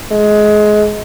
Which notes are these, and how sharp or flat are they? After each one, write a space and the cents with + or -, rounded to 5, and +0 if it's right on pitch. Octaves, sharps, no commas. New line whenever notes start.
G#3 +20